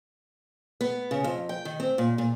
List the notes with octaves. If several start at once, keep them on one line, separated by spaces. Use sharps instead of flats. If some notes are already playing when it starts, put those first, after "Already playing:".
B3
C#3
F2
G5
D#3
C4
A#2
A#2